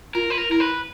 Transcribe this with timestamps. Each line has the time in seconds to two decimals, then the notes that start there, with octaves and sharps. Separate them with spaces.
0.15 F4 A#4
0.30 B4
0.38 A#4
0.50 E4 A#4
0.60 B4